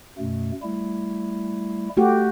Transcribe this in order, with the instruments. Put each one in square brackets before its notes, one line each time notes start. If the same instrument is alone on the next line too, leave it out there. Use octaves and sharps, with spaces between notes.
[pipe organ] F#2 B2 A3
G3 A3 E4
[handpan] A3 F#4 G4